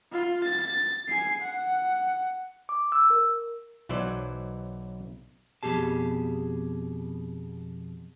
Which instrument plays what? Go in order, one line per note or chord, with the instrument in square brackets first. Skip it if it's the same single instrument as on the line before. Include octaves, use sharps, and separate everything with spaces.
[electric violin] F4
A6
G#5 C7
F#5
[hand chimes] D6
E6
A#4
[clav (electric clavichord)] B1 E3 F#3 C5 D5
[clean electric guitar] F2 B2 G4 G#4 A5